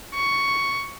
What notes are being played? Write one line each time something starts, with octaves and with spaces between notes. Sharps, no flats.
C#6